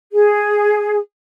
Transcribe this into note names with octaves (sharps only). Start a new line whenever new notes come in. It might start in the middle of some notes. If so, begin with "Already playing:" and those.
G#4